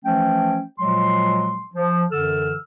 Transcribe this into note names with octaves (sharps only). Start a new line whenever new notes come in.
E3 F3 A3 C#4 G5
A#2 F3 F#3 G#3 C6
F3
F#2 D3 E3 A4 E6 F6